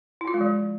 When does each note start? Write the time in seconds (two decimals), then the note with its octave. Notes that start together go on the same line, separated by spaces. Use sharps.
0.21 E4
0.28 F4
0.34 G#3
0.41 F3